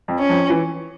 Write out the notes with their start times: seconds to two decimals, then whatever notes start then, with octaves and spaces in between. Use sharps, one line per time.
0.08 F2 F3
0.19 C#4
0.29 F2 F3
0.50 E3